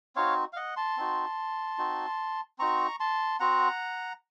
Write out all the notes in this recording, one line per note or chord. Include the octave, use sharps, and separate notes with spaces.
C4 D#4 F#4 C#5 F5
F5
D#5 F#5
A5 C6
C4 D#4 F#4
C4 D#4 F#4
C4 D#4 F#4 A#5 C#6
A5 C6
C4 F#4 F#5 A#5